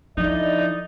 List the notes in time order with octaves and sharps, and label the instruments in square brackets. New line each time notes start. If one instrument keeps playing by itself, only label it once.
[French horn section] D3 E4 D#5 [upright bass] F3 [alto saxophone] D#4 [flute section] D5